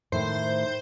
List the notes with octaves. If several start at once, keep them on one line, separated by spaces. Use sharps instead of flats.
A2 D#3 C5